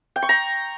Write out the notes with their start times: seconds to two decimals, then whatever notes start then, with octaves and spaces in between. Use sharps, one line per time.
0.16 G5
0.22 C#6
0.29 A#5